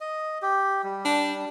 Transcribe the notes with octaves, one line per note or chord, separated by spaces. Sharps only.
D#5
G4
G3
D4